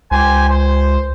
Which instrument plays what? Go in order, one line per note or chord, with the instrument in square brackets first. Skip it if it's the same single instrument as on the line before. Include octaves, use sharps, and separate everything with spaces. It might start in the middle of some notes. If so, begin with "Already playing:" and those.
[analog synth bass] C#2 [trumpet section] G4 C5 G#5
[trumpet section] C5